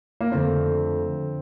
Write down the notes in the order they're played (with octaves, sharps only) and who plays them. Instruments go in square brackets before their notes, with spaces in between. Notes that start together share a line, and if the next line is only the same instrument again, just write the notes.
[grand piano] A#3
[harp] F2 D3 A3 [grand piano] C4